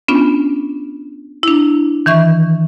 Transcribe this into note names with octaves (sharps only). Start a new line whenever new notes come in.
B3 C#4 D4 F4
D4 E4
D#3 E3 E5 C#6